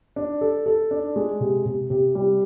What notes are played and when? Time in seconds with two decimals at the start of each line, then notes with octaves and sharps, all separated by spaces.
0.16 D4
0.41 A4
0.66 A4
0.91 D4
1.16 G#3
1.40 C3
1.65 C3
1.90 C3
2.15 G3